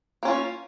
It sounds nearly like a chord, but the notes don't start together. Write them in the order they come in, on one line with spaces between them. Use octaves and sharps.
A#3 C#4 F4